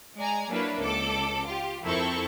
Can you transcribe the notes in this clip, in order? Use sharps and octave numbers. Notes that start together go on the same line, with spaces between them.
G#3 D5 G#5 A#5
F#3 A#3 D4 E4 B4 C#5
C#2 A4 D6
F4 G4
F2 C4 E4 A4 A#4 C#6